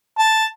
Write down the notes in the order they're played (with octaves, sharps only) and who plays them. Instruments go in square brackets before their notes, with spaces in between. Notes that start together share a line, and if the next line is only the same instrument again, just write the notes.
[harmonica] A5